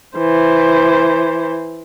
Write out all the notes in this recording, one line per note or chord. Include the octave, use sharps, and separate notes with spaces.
E3 C5